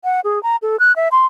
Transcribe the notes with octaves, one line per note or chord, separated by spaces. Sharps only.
F#5
G#4
A#5
A4
F#6
E5
C6